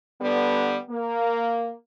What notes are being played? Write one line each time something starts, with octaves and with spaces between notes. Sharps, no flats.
D3 G3 B3
A#3